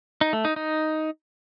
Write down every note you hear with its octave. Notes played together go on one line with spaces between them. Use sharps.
D#4
A3
D#4
D#4